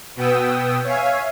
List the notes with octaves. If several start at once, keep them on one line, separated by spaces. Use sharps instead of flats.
B2 B3 G5 D#6 E6
C#5 E5 F5 G#5